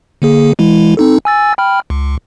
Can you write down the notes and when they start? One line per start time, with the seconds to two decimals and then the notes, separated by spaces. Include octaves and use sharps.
0.22 D3 A#3 G#4
0.59 E3 G#3 E4
0.97 C4 D#4 A4
1.25 G#5 E6 A6
1.58 G5 B5 F6
1.90 C#2